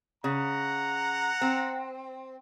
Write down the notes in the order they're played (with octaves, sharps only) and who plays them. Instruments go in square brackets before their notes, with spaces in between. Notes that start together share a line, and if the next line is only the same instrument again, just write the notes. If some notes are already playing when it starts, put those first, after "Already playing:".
[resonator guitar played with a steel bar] C#3 [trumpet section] F#5 A#5
[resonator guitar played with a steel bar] C4